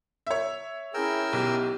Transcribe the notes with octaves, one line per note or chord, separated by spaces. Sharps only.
C#5 E5
C#4 E4 G#4 A#4 G5 E6
B1 G4